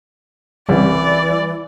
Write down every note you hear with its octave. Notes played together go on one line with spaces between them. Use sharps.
C2 C#3 E3 G3 D5